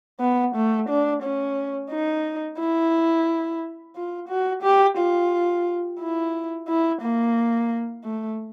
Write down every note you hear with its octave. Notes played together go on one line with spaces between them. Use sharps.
B3
A3
D4
C#4
D#4
E4
F4
F#4
G4
F4
E4
E4
A#3
A3